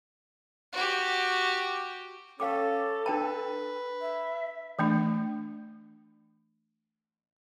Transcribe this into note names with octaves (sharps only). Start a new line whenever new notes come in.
F#4 G4
C#4 A4 F5 G5 D6
D4 B4 G5 A5
E5
E3 A3 D4